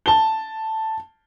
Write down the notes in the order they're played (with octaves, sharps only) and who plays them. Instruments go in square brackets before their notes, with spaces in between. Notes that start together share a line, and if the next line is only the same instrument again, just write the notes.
[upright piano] A5 G7